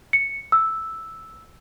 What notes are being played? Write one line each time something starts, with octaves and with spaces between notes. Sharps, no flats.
C#7
E6